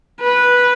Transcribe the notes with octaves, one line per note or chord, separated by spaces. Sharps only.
B4